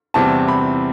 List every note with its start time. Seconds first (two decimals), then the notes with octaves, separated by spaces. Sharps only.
0.14 E2 C3 E3 G3 C4 A5
0.48 B5